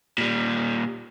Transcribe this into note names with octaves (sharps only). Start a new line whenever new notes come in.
A#2 G3